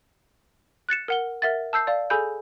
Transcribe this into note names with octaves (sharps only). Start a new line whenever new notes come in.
F#6 A6 C#7 E7
A#4 F#5 G7
A#4 E5 F#5 A6
A5 E6 G6 C7
D5 F5
G#4 A4 G#5 B5 G6